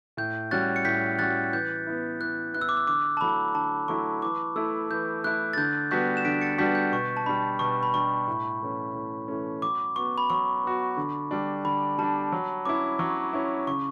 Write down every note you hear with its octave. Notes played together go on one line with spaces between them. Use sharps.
A2 G6
G3 C#4 F#4 F#6 A6
C#7
A2 G6 B6
G3 C#4 F#4 F#6 A6
E3 G6
B3 E4
E3 F#6
B3 E4 F#6
E6
D6
E6
D3 D6
A5
F#3 A3 E4 B5
D3 A5
F#3 A3 E4 C#6
E3 D6
A3 E4 E6
E3 G6
A3 E4 F#6
A6
D3 G6
G3 B3 D4 F#4 G6 B6
E7
D3 B6 D7
A6 C#7
G3 B3 D4 F#4 G6 B6
G6
B2 C#6
A5
G3 D4 B5
B2 C#6
B5
G3 D4 C#6
A2
E3 A3 C#4
A2
E3 A3 C#4
F#3 D6
B3 F#4 C#6
B5
F#3 C#6
B3 F#4
D3
G3 D4
D3 B5
G3 D4 A5
F#3
C#4 E4 D6
F#3 C#6
C#4 E4
C#3 C#6